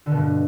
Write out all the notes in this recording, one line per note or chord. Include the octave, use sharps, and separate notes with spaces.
D3
B2
G2